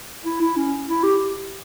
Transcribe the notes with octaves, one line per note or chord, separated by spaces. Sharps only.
E4
E4
C#4
E4
G4